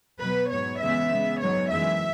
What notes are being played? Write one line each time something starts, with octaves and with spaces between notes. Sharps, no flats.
B2 F#3 B3 B4
G#2 F#3 B3 C#5
C#3 E3 G#3 B3 E5
C#3 G#3 B3
G#2 F#3 B3 C#5
F#2 E3 G#3 E5